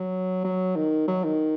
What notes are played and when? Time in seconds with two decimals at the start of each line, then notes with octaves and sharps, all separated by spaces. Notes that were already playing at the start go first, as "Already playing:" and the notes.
Already playing: F#3
0.44 F#3
0.76 D#3
1.08 F#3
1.24 D#3